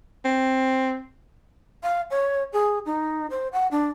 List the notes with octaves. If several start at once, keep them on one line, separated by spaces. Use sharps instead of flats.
C4
F5
C#5
G#4
D#4
C5
F#5
D4